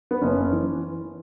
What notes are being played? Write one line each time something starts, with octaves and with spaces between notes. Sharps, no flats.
B3
F#1 C#4
E3